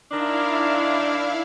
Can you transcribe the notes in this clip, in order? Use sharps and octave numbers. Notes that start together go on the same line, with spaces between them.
D#3 D4 E4 F5